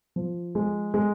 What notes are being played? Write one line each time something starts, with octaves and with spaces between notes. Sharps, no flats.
F3
G#3
G#3